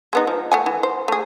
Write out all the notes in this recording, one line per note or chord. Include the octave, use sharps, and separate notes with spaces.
G#3 B3 D#4
F3
A3 F#5 G#5
E3
C5
A3 G#4